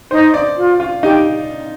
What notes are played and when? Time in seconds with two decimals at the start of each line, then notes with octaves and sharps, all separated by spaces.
0.11 D#4 C5
0.34 D5
0.57 F4
0.80 F4
1.03 D#4 G4